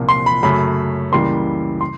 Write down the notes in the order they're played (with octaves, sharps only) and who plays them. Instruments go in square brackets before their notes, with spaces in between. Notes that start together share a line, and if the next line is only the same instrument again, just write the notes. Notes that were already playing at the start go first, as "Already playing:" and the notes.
Already playing: [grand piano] C2 A#2 F3 A#3
C6
B5
F#2 C#3 F#3 A3 B5
C#2 C#3 E3 G3 A#3 C6
C6